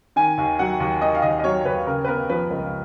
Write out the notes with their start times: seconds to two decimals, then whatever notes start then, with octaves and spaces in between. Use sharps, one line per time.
0.16 D#3 G#5
0.38 D#2
0.59 F#3 F#5
0.80 D#2
1.01 D#3 D#5
1.15 F5
1.22 D#2 D#5
1.39 D#5
1.44 F#3 C#5
1.65 D#2 B4
1.86 C#3 A#4
2.05 B4
2.08 B3 A#4
2.30 F3 B4
2.50 C#2 B4